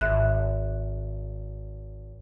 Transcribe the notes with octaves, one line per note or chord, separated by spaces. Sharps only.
G#1 G#2 E5 F#6